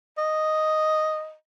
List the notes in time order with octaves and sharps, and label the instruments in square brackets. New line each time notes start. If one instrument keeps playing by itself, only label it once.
[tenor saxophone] D#5